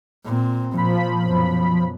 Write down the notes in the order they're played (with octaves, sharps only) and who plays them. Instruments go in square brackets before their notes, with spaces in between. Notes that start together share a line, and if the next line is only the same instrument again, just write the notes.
[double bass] A#2 C4
[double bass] A#2 [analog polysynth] F3 B5
[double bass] F#2 B2